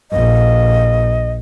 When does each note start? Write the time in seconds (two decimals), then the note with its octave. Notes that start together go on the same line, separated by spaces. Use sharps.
0.11 A#1 D#5